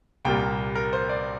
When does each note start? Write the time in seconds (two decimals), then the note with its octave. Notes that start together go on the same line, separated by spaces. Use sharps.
0.25 C2 A#2 G3 A#3 G5
0.75 A#4
0.93 C5
1.09 D5